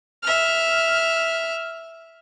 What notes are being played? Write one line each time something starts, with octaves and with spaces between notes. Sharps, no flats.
E5 F6